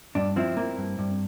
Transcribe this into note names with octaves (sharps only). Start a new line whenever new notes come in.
G2 D4
F3 C4 E4
A#3
G2
G2